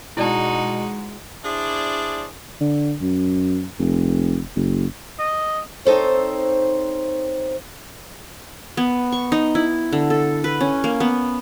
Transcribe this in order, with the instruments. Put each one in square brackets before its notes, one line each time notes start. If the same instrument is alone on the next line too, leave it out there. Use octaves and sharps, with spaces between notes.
[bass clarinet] B2 [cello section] G#3 [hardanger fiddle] D#4 F#4 [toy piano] E4 D5 A5
[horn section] D4 E4 G#4 C5 D5
[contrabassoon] D3
F#2
F1
F#1
[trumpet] D#5
[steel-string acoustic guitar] C4 D#4 A4 C5 C#5
[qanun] B3
C#6
D#4
E4
D3
A4
B4
C#4
A#3
B3